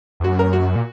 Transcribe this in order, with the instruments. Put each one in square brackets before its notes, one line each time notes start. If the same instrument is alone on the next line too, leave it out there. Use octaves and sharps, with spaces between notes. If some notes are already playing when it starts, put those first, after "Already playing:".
[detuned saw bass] E2
[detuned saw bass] F#2 [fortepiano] F#4
[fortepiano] A#4
F#4
[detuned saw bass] A#2